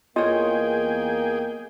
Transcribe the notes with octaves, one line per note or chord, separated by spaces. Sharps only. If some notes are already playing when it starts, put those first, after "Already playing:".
E2 A#3 F4 G#4 C#5 D#5 G5